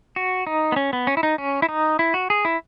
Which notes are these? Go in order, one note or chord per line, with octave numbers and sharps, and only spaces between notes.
F#4
D#4
B3
C#4
B3
C#4
E4
D#4
C#4
E4
D#4
E4
F#4
G#4
E4